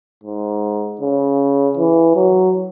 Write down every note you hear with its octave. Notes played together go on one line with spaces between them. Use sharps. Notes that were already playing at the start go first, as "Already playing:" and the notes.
G#2
C#3
E3
F#3